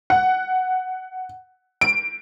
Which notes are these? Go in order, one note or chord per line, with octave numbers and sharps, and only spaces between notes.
F#5
D7